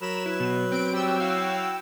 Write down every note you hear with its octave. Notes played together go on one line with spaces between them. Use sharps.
F#3 A#4 B5 E7
E4 B4
B2
C4 D7
G3 G5 E6
E4 F#4 F5